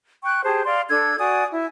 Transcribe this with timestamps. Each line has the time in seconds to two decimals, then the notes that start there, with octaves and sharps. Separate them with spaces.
0.24 G5 C#6 F#6
0.45 G4 G#4 C5 A5
0.66 D5 F5 C6
0.89 D4 A4 E6 G#6
1.18 F#4 D5 G#5 D#6
1.51 E4